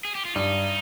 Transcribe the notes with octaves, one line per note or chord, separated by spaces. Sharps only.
G#4
G4
F4
G2 D#4